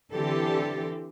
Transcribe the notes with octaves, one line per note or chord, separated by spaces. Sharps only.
D3 E3 C4 G4 A4